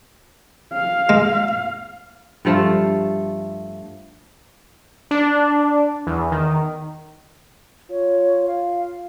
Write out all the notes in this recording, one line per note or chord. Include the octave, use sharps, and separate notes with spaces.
F5
G#3
G2 F3 A3 F4
D4
E2
D#3
F4 C#5
F5